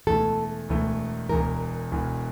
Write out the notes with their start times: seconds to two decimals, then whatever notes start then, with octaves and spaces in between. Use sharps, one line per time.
0.07 E1 E2 E3 A3 A4
0.69 E1 E2 E3 A3
1.29 E1 E2 E3 A#4
1.92 E1 E2 E3